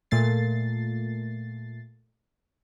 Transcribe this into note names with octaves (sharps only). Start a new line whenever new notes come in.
A#2 A3 A6 C7